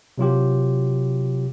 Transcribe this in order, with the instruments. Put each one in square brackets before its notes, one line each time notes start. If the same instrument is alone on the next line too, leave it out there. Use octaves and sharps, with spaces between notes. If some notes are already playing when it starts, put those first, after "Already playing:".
[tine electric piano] C3 F#3 F4 G4